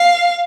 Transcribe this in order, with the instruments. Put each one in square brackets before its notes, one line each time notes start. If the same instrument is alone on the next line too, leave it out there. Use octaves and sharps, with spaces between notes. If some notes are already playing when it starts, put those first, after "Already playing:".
Already playing: [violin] F5